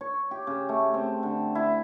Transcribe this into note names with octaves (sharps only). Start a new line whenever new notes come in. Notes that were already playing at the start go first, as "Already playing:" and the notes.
C#5
G4
C#3
A3
C4
D3
E4